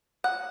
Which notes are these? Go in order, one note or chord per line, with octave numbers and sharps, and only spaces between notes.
F#5